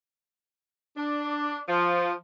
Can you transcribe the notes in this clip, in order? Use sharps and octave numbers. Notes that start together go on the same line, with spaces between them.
D4
F3